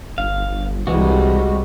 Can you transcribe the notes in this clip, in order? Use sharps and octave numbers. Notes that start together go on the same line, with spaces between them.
G1 F5
C2 E3 G3 G#3 F#4